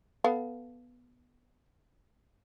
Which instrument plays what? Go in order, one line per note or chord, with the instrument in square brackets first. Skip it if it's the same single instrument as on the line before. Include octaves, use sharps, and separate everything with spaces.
[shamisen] B3 A4 F5